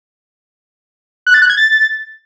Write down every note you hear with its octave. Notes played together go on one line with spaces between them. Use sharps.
F#6
A6
F#6
G#6
A6